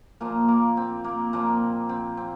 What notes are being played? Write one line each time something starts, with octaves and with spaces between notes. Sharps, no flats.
A#2 F3 A#3
A#3
C4
A#3
A#2 F3 A#3
C4
C4